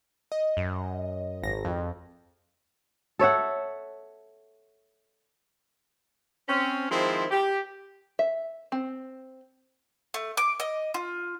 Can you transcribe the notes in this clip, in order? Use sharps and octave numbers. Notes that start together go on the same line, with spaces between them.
D#5
F#2
G#1 A#6
F2
A4 C#5 E5 F#5
C4 C#4
D#3 F3 G#3 C4 E4
G4
E5
C4
A3
D6
D#5
F4